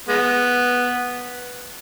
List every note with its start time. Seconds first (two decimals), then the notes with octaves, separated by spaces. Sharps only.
0.08 G#3 B3